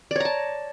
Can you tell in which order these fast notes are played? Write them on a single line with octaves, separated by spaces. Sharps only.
D5 C#5 A#5 A5